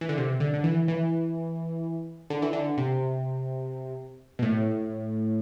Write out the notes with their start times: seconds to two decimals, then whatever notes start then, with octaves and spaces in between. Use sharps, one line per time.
0.01 E3
0.09 D3
0.18 C3
0.40 D3
0.54 D3
0.64 E3
0.88 E3
2.30 D3
2.42 E3
2.53 D3
2.78 C3
4.39 B2
4.42 A2